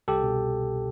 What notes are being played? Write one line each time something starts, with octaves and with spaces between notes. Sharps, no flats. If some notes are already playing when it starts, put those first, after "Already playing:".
C2 G4 A4
B2